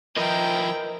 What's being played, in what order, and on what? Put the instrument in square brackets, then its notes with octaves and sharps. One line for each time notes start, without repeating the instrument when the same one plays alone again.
[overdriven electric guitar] F3 E4 [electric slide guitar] A#4 B4 D#5 [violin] G5 A#5